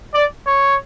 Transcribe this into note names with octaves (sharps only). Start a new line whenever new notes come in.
D5
C#5